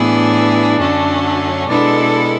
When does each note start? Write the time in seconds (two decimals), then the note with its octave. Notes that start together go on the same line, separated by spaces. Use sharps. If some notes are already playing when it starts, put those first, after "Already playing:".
Already playing: A2 E3 B3 D4 E4 G#4
0.79 F#2 D3 F#3 A3 C#4
1.67 B2 G#3 B3 D4 E4 A4